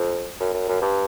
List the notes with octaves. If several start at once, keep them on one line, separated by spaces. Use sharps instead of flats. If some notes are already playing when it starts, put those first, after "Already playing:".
Already playing: F2
F#2
F#2
F#2
G2